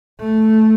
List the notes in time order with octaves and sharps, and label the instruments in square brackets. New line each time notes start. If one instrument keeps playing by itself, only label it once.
[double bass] A3